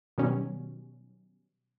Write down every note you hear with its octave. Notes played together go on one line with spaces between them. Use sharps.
B2 D#3 F#3 G3 C#4